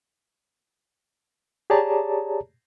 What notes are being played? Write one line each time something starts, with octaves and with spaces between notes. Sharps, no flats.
G4 G#4 C#5 D5 A5 A#5